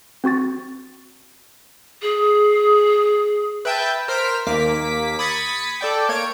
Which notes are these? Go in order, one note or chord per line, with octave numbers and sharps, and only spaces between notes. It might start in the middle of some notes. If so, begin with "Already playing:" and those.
C4 F#4 C#6 A6
G#4
B4 E5 G5 A5 G6
A#4 C5 F6 B6 D7
D#2 A#3 D6 B6
B5 D#6 G#6 A6 B6 C#7
A4 D5 G5
A#3 C#5 G#6 D7